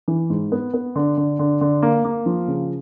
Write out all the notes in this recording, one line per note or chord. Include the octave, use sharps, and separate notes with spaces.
E3
G#2
B3
B3
D3
D3
D3
D3
A#3
A#3
F3
C#3